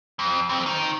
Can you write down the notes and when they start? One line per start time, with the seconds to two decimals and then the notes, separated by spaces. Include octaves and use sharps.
0.19 F2
0.50 F2 C4
0.66 D#3